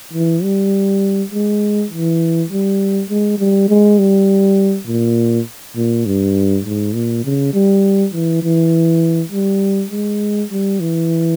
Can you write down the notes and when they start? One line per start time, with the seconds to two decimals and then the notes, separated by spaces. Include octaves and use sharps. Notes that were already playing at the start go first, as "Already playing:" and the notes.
0.13 E3
0.43 G3
1.32 G#3
1.91 E3
2.50 G3
3.10 G#3
3.39 G3
3.69 G#3
3.99 G3
4.87 A#2
5.77 A#2
6.06 G2
6.65 G#2
6.95 A#2
7.24 C#3
7.54 G3
8.13 E3
8.42 E3
9.32 G3
9.91 G#3
10.51 G3
10.80 E3